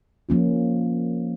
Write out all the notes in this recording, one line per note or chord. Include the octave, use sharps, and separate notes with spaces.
F3 A#3 C#4 F4